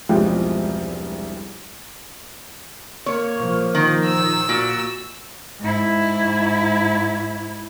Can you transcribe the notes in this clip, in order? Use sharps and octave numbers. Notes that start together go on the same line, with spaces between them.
E1 C2 G2 F3 G#3 G5
A#3 C#5
A#2 F3
D#3
E6
A#2 F#4
G#2 E4